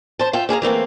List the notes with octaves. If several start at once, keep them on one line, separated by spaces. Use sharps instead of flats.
C5 A5
F4 E5 G5
A#3 G#4 F5 A#5
E3 A3 A#3 C4